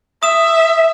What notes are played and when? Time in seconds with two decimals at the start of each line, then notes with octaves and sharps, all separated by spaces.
0.23 E5 D#6 E7